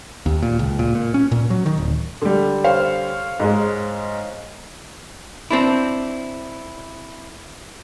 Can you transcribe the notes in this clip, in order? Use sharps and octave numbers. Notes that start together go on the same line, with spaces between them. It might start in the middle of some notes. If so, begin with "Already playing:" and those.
D#2
A#2
C#2
A#2
A#2
C#4
A#2
F#3
D#3
D1
D3 G3
C5 C#5 F5
G#2 G#3
C4 D4 E4